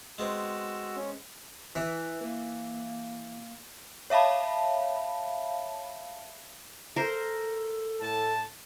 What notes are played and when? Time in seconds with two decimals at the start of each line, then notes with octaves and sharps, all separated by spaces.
0.18 G#3 B3 C4 F#4 E6
0.96 C#4
1.75 E3 B4
2.22 A#3
4.10 C#5 E5 F5 A5 B5
6.96 A4 A#4 C5
8.01 A2 A5